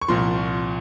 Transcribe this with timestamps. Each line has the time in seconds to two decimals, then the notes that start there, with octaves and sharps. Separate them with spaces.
0.02 C#6
0.08 C2 A#2 F3 C6